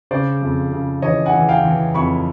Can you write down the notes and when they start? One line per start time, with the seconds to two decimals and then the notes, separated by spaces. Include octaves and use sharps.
0.11 C#3 C5 D5
0.41 F2
0.72 C#3
1.02 E3 C#5 D#5
1.26 F#5 G#5
1.34 E3
1.49 F5 G5
1.65 E3
1.94 F2 B5 C#6